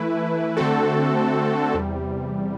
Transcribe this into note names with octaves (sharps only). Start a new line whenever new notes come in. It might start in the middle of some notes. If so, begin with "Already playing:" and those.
Already playing: E3 A3 E4 B4
D3 A3 C4 F#4 A4
E2 C3 G3